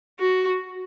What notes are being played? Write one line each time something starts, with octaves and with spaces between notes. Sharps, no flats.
F#4